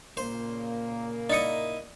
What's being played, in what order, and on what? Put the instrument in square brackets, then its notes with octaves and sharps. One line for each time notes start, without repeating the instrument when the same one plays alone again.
[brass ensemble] A#2 C#3 A#3 [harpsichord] C5
[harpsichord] D#4 E4 D#5 [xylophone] D5 C#7